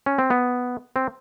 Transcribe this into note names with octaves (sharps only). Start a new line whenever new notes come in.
C#4
C4
B3
C4